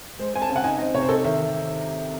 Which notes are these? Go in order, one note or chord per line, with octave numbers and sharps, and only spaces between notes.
G#3 C5
C4 G#5
A5
C#3
F#5
D#4 G#5
C4 D#5
C3 C#5
C5
D#4 A4
D#3 E5